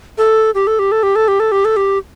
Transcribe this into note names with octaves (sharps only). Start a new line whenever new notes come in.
A4
G4
A4
G4
A4
G4
A4
G4
A4
G4
A4
G4